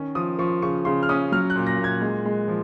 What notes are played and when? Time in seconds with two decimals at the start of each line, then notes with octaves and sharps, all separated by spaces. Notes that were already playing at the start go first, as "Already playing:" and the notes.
Already playing: D#3 C#4
0.15 F3 D#6
0.39 F3 C#6
0.62 C#3 C#6
0.85 C#3 C6
1.03 F6
1.09 C#4 D#6
1.32 F#3 F6
1.50 F#6
1.56 A#2
1.67 A#6
1.78 A#2
1.84 G#6
2.01 G#3
2.26 G#3
2.48 F3